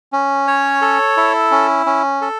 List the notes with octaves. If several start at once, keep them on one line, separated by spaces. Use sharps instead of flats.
C#4
C#5
A4
E4
C#4
C#4
A4